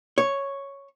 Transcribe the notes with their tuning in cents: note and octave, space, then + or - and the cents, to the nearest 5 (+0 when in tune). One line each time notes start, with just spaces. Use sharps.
C#5 +0